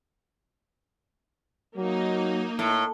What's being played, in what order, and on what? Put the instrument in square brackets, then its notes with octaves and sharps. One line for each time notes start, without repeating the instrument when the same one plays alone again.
[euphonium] F#3 [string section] A#3 D#4
[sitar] A2